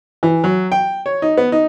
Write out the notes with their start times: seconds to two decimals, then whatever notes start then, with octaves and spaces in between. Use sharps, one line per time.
0.23 E3
0.44 F#3
0.72 G5
1.06 C#5
1.22 D#4
1.37 B3
1.52 D#4